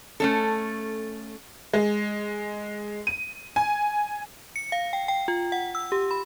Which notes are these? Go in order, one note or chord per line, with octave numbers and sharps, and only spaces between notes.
A3 C#4 A4
G#3
D#7
G#5
C#7
F5
G5
G5
F4
F#5
E6
G4
B5